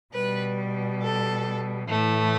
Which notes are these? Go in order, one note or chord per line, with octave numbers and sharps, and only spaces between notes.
B2 G3 B4
A4
A2 E3 A3